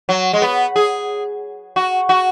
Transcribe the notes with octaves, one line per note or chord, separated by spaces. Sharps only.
F#3
G#3
B3
G#4
F#4
F#4